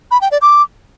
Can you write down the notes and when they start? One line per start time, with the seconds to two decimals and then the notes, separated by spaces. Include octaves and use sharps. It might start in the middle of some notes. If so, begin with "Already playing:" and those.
0.11 B5
0.21 G5
0.31 D5
0.42 D6